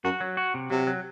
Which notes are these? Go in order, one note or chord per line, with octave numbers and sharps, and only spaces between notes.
F#2 F#4
F#3
F#4
C3
C3 F#3
F#3